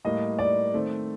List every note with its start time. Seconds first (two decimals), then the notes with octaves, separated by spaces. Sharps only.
0.05 A2 G3 A#3 D#5
0.39 D5
0.73 D#3 A3 C4